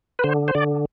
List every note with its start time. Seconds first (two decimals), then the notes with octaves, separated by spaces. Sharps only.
0.19 B4
0.24 D3 C5
0.48 C5
0.55 D3 D5